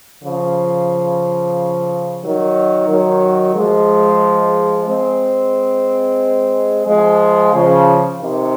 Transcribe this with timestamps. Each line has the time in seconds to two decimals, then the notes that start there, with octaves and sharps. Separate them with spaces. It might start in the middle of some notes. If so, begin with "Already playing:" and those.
0.24 C#3 F3
2.23 D#3 F#3
2.89 D#3 F#3
3.56 F3 G#3
4.88 G#3 C4
6.87 F3 G#3
7.53 C#3 F3
8.19 C3 D#3